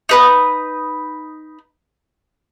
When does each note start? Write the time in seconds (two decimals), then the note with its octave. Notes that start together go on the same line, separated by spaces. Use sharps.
0.09 D#4 B4 D#6